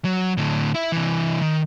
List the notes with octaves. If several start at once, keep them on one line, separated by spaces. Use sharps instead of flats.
F#3
A2 D3
E4 E5
C3 E3
D#3